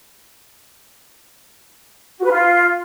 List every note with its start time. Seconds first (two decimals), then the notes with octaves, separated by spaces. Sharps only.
2.18 F#4
2.24 B4
2.30 F4